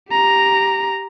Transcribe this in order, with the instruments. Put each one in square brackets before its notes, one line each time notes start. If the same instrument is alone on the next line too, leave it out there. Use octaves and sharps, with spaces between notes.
[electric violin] G4 A#5